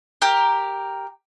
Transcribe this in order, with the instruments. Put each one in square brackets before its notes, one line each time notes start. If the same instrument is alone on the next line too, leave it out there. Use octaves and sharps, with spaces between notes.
[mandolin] G4 A#4